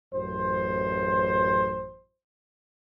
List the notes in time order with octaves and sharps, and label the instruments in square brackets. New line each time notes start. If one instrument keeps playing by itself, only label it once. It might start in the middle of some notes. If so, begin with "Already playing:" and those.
[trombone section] A1 F#2 C5